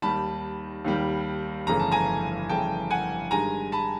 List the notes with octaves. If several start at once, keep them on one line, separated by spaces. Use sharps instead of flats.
D#2 D#3 G3 A5 B5
D#2 D#3 G3
G1 F2 C#3 E3 A3 A#5
A5
G#5 A#5
G1 F2 C#3 E3 A3 G5 A5
F#5 G#5
G2 D#3 G#3 G#5 A#5
A5 B5